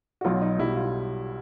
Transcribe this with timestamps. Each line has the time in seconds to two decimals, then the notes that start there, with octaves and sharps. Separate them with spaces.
0.21 F#4
0.24 B1 B2 F#3 F4
0.41 D#4
0.59 B1 B2 G3 E4
0.76 F4